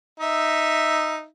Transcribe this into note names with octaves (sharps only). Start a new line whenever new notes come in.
D#4 E5